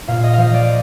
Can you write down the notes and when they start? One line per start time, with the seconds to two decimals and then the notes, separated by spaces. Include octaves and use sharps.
0.08 A#2 F5
0.23 D#5
0.33 F3 D#5 F5
0.54 D5